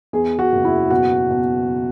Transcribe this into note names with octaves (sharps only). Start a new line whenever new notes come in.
E2 G#4
F#4
F#1
E4
B2 F#4
B2